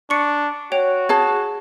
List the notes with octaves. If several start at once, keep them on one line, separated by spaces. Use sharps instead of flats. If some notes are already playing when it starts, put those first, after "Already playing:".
D4 C#6 C#7
F#4 C#5 G5 F7
G#4 A5 G#6